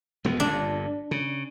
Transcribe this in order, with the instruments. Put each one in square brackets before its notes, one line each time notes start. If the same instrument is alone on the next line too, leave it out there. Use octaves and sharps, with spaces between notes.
[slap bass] E1 D#2 B3
[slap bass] G1 G2 A#2 [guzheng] D4
[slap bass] C#3